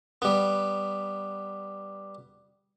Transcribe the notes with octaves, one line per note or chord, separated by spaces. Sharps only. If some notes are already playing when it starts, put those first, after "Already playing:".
G3 B3